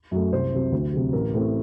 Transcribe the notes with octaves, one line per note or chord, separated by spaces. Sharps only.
F#2 F#3 A3
C2 C5
C3 F#3
D2
C3 F#3
A1 A#4
A2 A3 C4